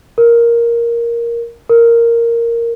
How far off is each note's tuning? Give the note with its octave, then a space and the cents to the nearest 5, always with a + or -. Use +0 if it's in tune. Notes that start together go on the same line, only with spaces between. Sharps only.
A#4 +5
A#4 -5